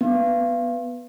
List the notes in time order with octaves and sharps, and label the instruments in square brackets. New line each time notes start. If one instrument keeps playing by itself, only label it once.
[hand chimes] B3